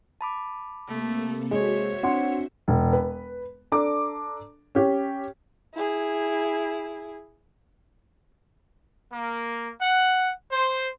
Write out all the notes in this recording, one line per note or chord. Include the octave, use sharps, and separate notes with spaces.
A5 B5 D6
C3 A3 A#3 A4
G#3 F#4 C5 C#5 E5
C4 D4 F#5 C6 C#7
E1
B4
D4 A4 A#5 D6
C#4 G4
E4 G#4
A#3
F#5
C5